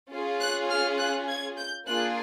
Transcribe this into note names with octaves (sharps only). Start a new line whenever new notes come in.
C#4 F4 G#4
F#6
F6
F#6
G#6
G6
A#3 D4 F4 G#4 F#6